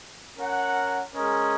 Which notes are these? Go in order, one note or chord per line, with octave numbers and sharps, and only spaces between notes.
C#4 A#4 F#5
G#3 C#4 A#4 D#5